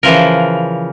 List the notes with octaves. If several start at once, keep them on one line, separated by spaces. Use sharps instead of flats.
C#3 E3 F3 A#4